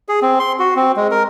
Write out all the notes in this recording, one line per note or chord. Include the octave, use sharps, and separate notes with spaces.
G#4
C4
C6
F#4
C4
G#3
A#4